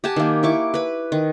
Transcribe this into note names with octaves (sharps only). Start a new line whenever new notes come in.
G4 F#5 G#5 A5
D#3 A#3
E4 C#6 D6
B4 B5
D#3